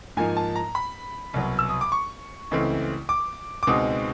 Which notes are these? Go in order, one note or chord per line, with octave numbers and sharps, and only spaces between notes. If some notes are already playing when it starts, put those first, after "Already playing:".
G#2 F3 A#3 D#4 G#5
A5
A#5
B5
C2 B2 F#3
E6
D#6
D6
C#6
C#2 C#3 E3 A3 C4
D6
D6
C#2 B2 G#3 C4 D#4 D#6